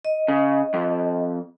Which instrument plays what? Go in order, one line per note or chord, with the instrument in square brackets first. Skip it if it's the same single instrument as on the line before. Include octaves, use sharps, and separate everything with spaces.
[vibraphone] D#5
[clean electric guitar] C#3
F2